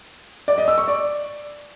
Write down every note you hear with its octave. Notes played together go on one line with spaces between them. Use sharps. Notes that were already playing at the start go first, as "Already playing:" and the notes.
D5
D#5
E6
C#6
D5